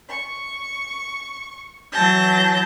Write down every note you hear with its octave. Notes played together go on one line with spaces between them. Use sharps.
C#6
E3 F#3 A5 G6 A#6